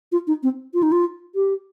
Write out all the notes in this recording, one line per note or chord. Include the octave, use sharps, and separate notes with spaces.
F4
D#4
C4
F4
D#4
F4
G4